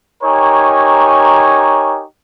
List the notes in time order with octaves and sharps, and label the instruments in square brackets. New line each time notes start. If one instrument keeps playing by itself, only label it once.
[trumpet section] D#4 G4 A#4 C#5 G#5 C#6